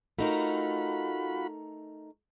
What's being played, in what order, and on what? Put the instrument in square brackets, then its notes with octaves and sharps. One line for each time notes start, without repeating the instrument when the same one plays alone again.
[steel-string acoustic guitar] A3 D#4 A#4 [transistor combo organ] F4 F#4 B5